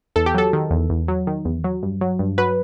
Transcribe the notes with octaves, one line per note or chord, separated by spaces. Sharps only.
E2 A4
G4
F#3 A4
D#3
E2
E2
F#3
D#3
E2
F#3
G2
F#3
G2
F#3 B4